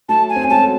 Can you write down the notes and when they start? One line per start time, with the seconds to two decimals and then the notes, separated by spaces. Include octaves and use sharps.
0.09 F#3 A3 A5
0.29 G#5
0.36 C4
0.43 C#4
0.50 G#3 C4 A5
0.62 F#4 A4